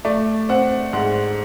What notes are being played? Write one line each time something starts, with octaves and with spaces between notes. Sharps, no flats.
A3 D5
C4 F#5
G#2 F#5